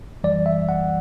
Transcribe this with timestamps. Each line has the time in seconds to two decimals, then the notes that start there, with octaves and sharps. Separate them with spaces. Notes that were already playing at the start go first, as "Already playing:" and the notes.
0.24 G1 F#2 E3 G3 D5
0.46 E5
0.69 F#5